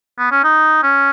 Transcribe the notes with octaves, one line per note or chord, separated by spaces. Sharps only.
B3
C#4
D#4
C#4